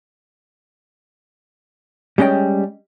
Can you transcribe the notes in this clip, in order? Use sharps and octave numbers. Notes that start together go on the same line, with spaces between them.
G3 G#3 C#4 D#5 G5